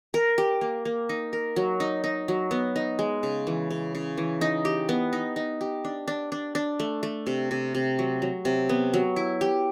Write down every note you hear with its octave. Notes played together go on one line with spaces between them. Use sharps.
A#4
G4
A#3
A#3
D#4
A#4
F#3
D#4
D#4
F#3
B3
D#4
G#3
C#3
E3
C#3
C#3
E3
D#4
G4
B3
D#4
D#4
G4
D4
D4
D4
D4
A3
A3
C3
C3
C3
F#3
F#3
C3
B3
F#3
E4
G4